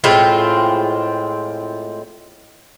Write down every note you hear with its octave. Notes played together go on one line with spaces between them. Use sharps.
A2 G#3 C4 F4